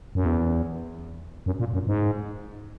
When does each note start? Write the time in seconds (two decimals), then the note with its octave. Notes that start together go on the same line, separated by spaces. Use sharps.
0.15 F#2
0.25 E2
1.46 F#2
1.60 A#2
1.74 F#2
1.87 G#2